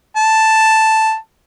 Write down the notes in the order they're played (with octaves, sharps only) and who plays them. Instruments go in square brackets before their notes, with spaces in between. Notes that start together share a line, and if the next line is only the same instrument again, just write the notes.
[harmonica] A5